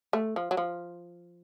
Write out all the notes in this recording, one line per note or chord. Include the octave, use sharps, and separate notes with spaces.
A3
F3
F#3
F3